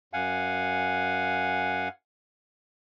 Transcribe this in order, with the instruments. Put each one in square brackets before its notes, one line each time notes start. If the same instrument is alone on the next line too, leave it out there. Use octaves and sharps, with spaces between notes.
[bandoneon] F#2 F5 F#5 G#5